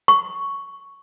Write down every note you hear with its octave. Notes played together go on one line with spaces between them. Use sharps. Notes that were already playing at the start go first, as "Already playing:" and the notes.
C#6